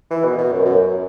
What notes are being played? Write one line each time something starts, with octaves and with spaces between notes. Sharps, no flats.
E3
B2
B2
F#2
F#2